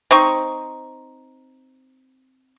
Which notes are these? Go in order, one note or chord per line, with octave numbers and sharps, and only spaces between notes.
C4 D#4 C#6